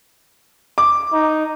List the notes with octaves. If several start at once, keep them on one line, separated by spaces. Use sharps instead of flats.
D6
D#4